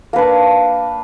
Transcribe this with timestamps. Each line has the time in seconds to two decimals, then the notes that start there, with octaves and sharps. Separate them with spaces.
0.13 A#3
0.16 B4
0.18 D4